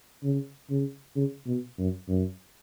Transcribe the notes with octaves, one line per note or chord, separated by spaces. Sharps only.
C#3
C#3
C#3
B2
F#2
F#2